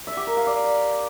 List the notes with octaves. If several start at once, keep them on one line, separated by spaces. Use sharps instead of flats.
E5
G4
A#4
F5
D5